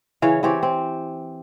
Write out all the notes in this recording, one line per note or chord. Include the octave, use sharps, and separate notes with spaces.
C#3 E3 C#5 F5
E3 C4 G4 C#5
C4